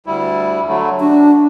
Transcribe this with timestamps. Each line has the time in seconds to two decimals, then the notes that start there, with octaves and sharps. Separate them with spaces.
0.06 D2 G3 E4
0.68 D3 F#3 A3
1.00 D4 F#4